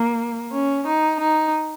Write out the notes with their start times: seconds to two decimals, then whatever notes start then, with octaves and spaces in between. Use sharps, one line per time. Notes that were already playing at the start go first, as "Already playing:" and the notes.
Already playing: A#3
0.52 C#4
0.85 D#4
1.19 D#4